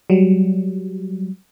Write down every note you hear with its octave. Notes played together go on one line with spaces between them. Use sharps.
F#3 G3